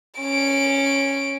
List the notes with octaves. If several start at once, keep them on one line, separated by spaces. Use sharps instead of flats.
C#4 D7